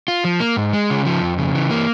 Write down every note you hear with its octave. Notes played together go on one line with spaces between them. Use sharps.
F4
F3
A#3
G#2
G#3
C#3
F3
F2
C#3
E3
A#3